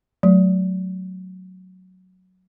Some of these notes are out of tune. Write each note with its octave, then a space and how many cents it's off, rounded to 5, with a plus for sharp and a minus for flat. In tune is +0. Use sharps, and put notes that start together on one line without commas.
F#3 +0 A3 -20